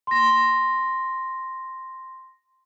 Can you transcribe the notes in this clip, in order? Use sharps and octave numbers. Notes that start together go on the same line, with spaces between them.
C6 A#6